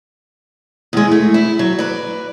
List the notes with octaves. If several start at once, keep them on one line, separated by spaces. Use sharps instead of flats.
E2 G#3
A3
E4
F#3
B4 D5